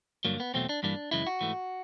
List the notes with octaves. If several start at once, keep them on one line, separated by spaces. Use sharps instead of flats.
G2 D3 F#3 A#3
B3
E2 B2 F#3 A3 C4
D4
G2 E3 G3 A#3 D4
F#2 C#3 E3 G#3 E4
F#4
G#2 E3 A3